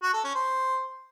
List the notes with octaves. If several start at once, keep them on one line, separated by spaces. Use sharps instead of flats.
F#4
A4
C#4
C5